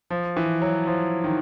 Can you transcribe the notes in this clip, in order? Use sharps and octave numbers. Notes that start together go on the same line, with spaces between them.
F3
E3
F#3
F3
D#3